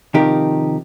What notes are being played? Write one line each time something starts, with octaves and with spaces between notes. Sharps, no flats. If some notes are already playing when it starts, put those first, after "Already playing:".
C3 D#3 F3 D#4 G4 A#4